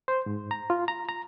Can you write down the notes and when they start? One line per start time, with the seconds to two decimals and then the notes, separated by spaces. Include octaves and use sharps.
0.08 C5
0.26 G#2
0.51 A#5
0.70 F4
0.88 A#5
1.09 A#5